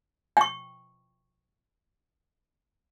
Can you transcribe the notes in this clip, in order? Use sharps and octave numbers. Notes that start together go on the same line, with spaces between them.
G5 C#6